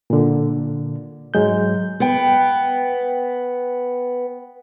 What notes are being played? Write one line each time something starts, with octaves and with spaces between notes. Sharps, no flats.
A#2 D3
G#2 F#3 G#3 G6
B3 G5